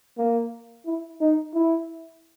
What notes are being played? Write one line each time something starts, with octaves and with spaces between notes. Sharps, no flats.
A#3
E4
D#4
E4